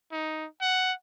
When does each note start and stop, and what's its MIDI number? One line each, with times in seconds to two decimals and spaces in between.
0.12 0.46 63
0.61 0.93 78